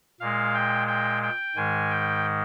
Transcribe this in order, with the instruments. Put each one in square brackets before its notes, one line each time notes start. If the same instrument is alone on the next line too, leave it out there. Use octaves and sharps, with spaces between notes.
[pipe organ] A#2 G#3 F5
G5
G5
G5
G#2 D#3 G#3 G#5
G5